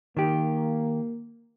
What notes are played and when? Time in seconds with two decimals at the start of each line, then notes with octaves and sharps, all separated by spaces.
0.17 D#3 A#3 G4